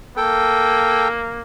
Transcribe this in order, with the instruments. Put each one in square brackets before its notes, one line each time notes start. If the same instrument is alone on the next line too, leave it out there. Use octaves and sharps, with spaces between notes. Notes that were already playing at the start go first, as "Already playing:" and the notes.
[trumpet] A#3 [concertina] A4 G5